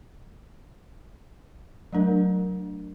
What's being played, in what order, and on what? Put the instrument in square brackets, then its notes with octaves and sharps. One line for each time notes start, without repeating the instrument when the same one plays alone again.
[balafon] F#3 A3 D4 A#4